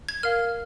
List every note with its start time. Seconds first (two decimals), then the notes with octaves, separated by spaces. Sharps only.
0.09 G#6
0.23 A#4 F5 F6